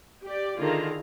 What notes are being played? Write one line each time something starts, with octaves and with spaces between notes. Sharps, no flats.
G4 D5
D3 D#3 E4 F4 G#4 A#5